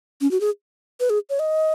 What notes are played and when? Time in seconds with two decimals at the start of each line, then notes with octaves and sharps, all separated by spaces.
0.21 C#4
0.31 F#4
0.41 G#4
1.00 B4
1.10 G#4
1.30 C#5
1.39 D#5